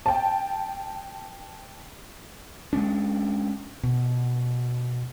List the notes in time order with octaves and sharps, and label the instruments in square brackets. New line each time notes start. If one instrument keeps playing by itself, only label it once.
[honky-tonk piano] G5 A5
[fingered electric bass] G#3 A3 C#4 D4
B2